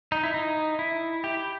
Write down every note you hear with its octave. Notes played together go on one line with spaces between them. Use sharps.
D#4
E4
D#4
E4
G4